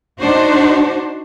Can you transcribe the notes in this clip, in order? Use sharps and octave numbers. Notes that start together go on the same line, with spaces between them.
D4 D#4 F#4 C5